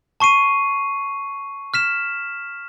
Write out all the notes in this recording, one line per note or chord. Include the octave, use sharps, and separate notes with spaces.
A5 C#6 C7 D#7
F6 B6 E7